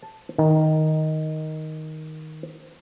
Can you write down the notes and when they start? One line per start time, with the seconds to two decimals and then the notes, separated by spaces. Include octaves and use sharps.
0.03 A5
0.38 D#3